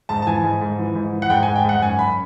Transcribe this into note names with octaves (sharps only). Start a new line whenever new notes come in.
G#2 A5
A5
E3 G#5
G#2
G#2
E3
G#2
E3
F#5
G#2 G5
G#5
G#2
G5
G#2 F#5
F#2 G#5
F#2 B5